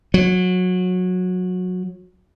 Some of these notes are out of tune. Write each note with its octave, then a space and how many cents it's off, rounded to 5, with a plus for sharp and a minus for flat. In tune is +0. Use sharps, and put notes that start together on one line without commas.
F#3 -20